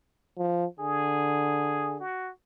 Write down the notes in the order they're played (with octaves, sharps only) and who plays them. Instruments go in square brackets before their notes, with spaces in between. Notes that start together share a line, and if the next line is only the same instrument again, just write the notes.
[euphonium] F3
[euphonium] D3 [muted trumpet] G#4
[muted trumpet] F#4